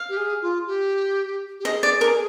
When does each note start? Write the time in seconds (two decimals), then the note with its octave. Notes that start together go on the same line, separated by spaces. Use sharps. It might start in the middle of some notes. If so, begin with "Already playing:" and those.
Already playing: F5
0.09 G4
0.17 G#4
0.42 F4
0.67 G4
1.60 G4
1.64 G#4 D#5
1.83 D5
2.01 A#4